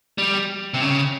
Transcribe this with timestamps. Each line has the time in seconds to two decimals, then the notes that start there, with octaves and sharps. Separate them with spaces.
0.18 G3
0.74 C3
0.81 C#3